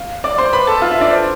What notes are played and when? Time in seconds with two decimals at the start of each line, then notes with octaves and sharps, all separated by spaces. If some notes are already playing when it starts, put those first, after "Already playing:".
Already playing: F5
0.24 D5 D6
0.38 C5 C6
0.53 B4 B5
0.67 A4 A5
0.82 F4 F5
0.91 E4 E5
1.01 D4 D5
1.10 C5